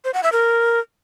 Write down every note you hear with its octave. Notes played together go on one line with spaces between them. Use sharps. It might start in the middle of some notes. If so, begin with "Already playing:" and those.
C5
F#5
E5
A#4